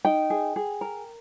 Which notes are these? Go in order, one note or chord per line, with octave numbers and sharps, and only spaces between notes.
D#4 G5
G#4
G#4
A#4